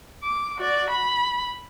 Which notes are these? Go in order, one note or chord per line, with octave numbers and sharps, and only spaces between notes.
D6
F#4 D5
B5